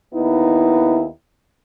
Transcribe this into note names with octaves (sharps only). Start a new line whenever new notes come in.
D#2 B3 D#4 E4